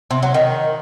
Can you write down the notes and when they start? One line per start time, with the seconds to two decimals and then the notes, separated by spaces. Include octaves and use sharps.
0.11 C3
0.22 F#3
0.34 D#3